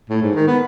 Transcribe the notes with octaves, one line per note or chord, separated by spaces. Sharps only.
A2
G#2
D#3
B3